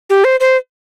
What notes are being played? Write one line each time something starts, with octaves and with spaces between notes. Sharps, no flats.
G4
C5
C5